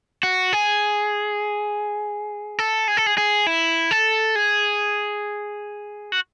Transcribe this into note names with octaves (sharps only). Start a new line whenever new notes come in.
F#4
G#4
A4
G#4
A4
G#4
G#4
E4
A4
G#4
F#4